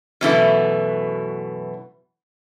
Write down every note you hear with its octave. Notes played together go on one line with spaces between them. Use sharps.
F#2 B2 E3 A3